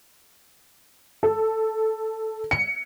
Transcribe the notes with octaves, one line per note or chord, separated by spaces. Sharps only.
A4
C#7